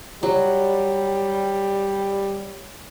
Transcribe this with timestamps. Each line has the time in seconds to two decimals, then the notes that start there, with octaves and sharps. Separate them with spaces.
0.23 F#3 G3